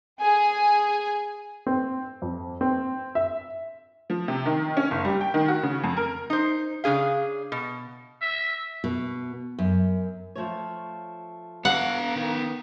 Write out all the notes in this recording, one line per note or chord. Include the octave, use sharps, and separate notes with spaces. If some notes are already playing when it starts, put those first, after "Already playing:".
G#4 G#5
C4
F2
C4
E5
F3
C3
D#3
C#4
F#1
G3
G5
D#3
F#4
C#3
F2
A#4
D#4 C5
C#3 D4 G#4 F5
B2
E5
B2
F#2
F3 A3 C#5
B3 F5 F#5
D#3